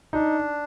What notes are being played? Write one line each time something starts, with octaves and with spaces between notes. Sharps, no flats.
D4 D#4